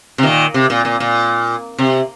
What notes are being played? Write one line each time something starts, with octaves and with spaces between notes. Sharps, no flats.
C3
A#2 D#3
C3
A#2
A#2
A#2
C3